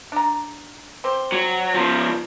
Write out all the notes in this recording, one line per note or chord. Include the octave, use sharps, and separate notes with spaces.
D4 A#5
C4 G4 C5
F#3
C#2 F3